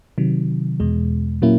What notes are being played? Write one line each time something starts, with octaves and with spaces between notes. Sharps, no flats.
C3 D#3 F#3
E2 B2 G#3
A#2 F#3 A#3 C#4 E4